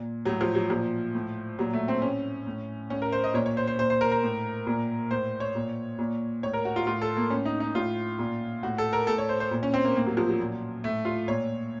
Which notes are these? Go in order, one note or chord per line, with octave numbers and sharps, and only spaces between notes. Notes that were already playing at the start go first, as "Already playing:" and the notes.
Already playing: A#2
A2 F#3
F3
F#3
A#2 F3
A2
A#2 F#3
A3
C4
A2 C#4
A2
A2 C#4
A#4
C5
D#5
A#2 C#5
C#5
C5
C5
A#2 C5
C5
A#4
A#4
A2
A#2
A2 C5
C#5
A#2
A#2
A2 C#5
A#4
F#4
F4
A2 F4
A4
A#3
A2 C#4
D#4
D#4
A2 F4
A#2
A2 F#4
A4
A#4
A2 A4
C#5
C5
C5
A#2
C#4
C4
A#3
A2 A#3
F#3
F3
F#3
A#2
A2 A3
F4
A#2 C#5